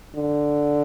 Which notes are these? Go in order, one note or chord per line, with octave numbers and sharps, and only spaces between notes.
D3